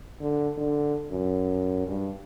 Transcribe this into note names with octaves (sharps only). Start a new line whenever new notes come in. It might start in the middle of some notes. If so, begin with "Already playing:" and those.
D3
D3
F#2
G2